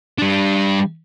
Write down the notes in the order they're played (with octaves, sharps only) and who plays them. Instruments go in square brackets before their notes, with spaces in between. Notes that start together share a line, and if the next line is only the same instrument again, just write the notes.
[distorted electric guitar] G3 D4